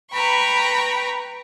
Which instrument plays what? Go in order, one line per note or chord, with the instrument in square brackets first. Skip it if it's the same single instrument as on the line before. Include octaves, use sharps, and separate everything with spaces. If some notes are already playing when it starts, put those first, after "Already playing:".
[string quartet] B4 G5 A#5 B5 C#6